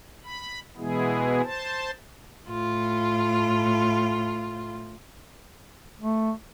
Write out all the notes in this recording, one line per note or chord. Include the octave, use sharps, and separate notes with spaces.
B5
B2 E3 G#3 B3 E4 G#4
C5 A5
A2 F4
A3